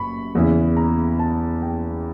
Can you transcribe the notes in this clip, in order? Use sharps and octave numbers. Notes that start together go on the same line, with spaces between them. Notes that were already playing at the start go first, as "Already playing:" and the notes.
Already playing: F#1 F#2 B5 C#6
E2 C#3 E3
A#5
A5
G5